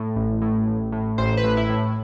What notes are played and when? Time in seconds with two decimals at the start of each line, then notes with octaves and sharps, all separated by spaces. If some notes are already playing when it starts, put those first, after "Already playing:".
Already playing: A2
0.16 A1
0.42 A2
0.68 A1
0.92 A2
1.18 A1 C5
1.37 B4
1.44 A2
1.57 E4
1.69 A2